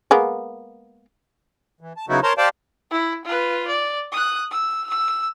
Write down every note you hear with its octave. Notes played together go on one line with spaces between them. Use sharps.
G#3 A#3 B3
E3
A5
C#3 F#3 B3 D#4 E4 F#4
A#4 C5 C#5 A5 A#5 C6
G4 C5 D5 F5 G5 A5
E4
F4 B4
D5
D#6 F#6
E6
E6